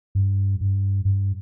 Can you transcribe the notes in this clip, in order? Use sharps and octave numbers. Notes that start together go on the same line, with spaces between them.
G2
G2
G2